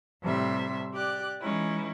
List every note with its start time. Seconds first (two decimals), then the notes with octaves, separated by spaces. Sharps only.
0.23 A2 C3 G3 E5 C6
0.92 G4 D5 F#6
1.41 E3 G#3 C#4 D#4 E4